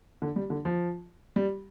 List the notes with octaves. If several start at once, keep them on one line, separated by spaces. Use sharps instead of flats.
D3
G3
D3
F3
G3